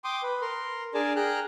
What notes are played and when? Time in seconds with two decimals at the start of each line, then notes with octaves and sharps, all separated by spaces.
0.04 G5 C6 D6 D#6
0.23 B4
0.41 A#4 C6
0.94 D4 G#4 A#4 D5 G#5 A5
1.16 G#4 G5 A#5 F6 F#6